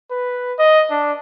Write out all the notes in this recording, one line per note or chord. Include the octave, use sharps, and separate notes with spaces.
B4
D#5
D4